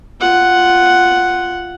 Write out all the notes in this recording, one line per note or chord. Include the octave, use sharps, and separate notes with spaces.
F4 F#5